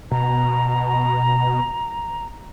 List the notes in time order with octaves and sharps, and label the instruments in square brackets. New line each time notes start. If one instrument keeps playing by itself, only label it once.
[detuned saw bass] B2 [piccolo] A#5